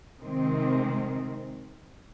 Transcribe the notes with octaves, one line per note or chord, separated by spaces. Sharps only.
C3 D#3 G#3 C4